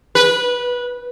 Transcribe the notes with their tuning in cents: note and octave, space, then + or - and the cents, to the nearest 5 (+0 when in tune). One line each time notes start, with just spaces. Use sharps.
B4 -15